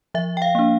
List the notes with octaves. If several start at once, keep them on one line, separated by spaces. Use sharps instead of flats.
F3 E5
G5
F5
A#3 D4